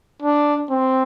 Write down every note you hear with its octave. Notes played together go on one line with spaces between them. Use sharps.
D4
C4